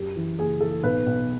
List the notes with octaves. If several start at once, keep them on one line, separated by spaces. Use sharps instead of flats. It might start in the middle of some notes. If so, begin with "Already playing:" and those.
Already playing: F#2 G4
E3
F#1 G#4
E3 A4
B1 B4
B1